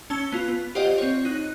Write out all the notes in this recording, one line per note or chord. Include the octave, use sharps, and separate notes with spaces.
C#4 A5 E6 G7
B3 F4
B3
F4 G4 C5 D5 D#5 F#5
C4 C#5
D#4 F#6